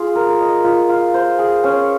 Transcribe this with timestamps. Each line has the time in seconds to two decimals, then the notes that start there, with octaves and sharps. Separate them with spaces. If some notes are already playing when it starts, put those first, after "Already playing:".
Already playing: F4 G#4
0.16 A#4
0.40 D#5
0.64 F4
0.89 F4
1.14 C5
1.39 G#4
1.64 C#4